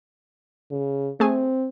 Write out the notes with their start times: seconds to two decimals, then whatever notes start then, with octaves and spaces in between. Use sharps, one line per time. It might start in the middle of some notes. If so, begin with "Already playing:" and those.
0.71 C#3
1.20 A3 C4 G#4 G#5